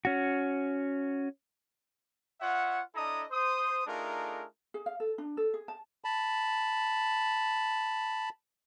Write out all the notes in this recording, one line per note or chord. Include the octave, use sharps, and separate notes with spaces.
C#4 F#4
F4 C#5 E5 F#5
D4 E4 A4 D#5 A#5 D#6
C5 D#6
A3 D4 D#4 F4 G#4 A#4
G#4
F5
A4
D4
A4
G#4
A5
A5 B5